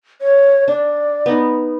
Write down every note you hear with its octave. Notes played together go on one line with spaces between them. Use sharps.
C#5
D4 D5
B3 D#4